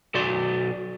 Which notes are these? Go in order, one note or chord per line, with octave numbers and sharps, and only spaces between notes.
B1 F#4 D5 C6